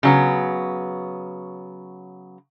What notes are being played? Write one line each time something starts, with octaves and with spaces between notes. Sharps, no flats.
C#3 F#3 B3